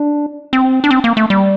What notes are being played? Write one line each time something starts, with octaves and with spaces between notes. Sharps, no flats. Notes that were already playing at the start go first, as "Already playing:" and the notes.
Already playing: D4
C4
D4
C4
A#3
A3
G3